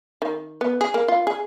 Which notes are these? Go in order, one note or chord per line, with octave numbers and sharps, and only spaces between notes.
D#3
B3
G#4
A#3
F4
G#4